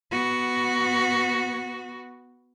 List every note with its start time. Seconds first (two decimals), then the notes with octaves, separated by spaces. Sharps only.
0.12 B3 F#4